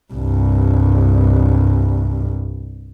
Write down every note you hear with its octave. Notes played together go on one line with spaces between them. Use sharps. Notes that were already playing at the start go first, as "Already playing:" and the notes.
C2 G2